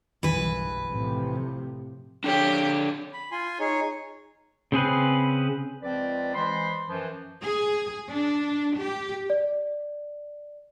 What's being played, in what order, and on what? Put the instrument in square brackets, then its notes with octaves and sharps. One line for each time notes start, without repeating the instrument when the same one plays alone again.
[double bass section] F#1 B1 G2 [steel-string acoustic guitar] E3 B4
[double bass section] A2 C3 F3
[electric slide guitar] D4 A4 C#5 [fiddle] G4
[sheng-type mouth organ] B5
F4 G#5 C6
D#4 G#4 C#5
[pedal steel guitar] C#3 C4 G#4 B4
[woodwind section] C#2 F3 C4 B4 D5
E3 G#3 C5 B5 C6
F#2 E3 F3
[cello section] G#4
D4
G4
[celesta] D5